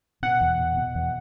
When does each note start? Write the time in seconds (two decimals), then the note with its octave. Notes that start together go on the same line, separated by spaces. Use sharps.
0.22 B2 F#5
0.41 E2
0.59 B2
0.77 B2
0.95 E2